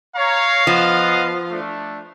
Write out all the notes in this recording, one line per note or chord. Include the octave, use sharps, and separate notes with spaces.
C#5 F5 A#5
F3 B3 D#5 F#5
A3 D4